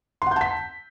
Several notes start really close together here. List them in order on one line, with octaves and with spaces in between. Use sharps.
C6 F#5 G6 A5 B6